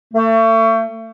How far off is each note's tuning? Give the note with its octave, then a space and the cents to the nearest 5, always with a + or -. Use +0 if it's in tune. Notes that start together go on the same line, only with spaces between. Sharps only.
A3 +35